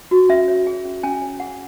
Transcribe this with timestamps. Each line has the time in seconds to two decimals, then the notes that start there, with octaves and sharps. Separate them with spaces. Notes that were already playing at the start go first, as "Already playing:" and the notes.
0.11 F#4
0.29 C#4 E5
0.48 C#5
0.67 G#4
0.85 C#4
1.03 C#4 G#5
1.22 C#5
1.40 G#4 F#5